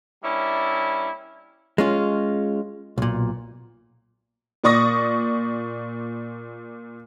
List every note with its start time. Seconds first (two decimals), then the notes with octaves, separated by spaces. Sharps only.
0.24 G3 A#3 C#4 D4 E4
1.78 G#3 C#4 F4
2.98 B1 A#2
4.64 A#2 D5 C#6 D#6 A#6